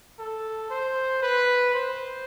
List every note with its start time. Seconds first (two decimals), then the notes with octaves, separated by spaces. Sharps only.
0.19 A4
0.70 C5
1.22 B4
1.74 C5